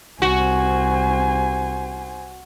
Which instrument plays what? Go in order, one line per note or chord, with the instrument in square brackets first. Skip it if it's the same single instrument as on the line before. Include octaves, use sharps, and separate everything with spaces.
[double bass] C2 [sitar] F#4 [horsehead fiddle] C5 G#5